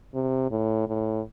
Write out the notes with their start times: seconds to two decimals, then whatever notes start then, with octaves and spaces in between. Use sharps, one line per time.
0.14 C3
0.51 A2
0.88 A2